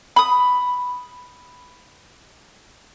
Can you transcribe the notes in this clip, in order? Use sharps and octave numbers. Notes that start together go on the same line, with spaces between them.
B5 D#6